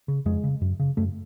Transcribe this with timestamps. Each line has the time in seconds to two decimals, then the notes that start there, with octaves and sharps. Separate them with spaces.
0.08 C#3
0.25 F2 G#3
0.44 C#3
0.61 F#2
0.80 C#3
0.97 F#2 A3